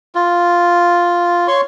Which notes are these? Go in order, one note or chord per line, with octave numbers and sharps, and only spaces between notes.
F4
C#5 C6 C#6